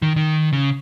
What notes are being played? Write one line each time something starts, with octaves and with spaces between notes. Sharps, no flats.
D#3
D#3
C#3